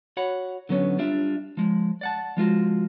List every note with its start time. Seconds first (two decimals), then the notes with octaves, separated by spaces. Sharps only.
0.17 F#4 C#5 F#5 B5
0.69 D3 F#3 B3 C#4
0.99 G3 D4 F4 E5
1.57 F3 G#3
2.01 D5 F#5 A5
2.37 F3 G#3 F4 F#4